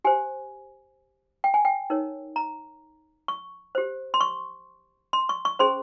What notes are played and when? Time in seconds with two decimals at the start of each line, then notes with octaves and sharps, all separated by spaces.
0.04 G4 C5 G#5
1.44 G5
1.54 G#5
1.65 G5
1.90 D#4 A#4 C#5
2.36 A#5
3.28 C#6
3.75 G4 C5
4.14 C6
4.21 C#6
5.13 C6
5.29 C#6
5.45 C#6
5.59 C#4 G#4 C5 C6